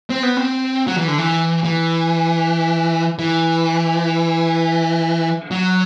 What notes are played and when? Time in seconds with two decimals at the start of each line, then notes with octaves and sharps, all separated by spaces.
0.10 C4
0.23 B3
0.37 C4
0.87 F#3
0.98 E3
1.08 D3
1.18 E3
1.65 E3
3.19 E3
5.51 F#3